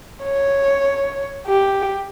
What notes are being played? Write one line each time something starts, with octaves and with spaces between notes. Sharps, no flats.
C#5
G4